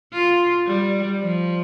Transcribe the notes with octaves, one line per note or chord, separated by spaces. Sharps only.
F4
G3
F3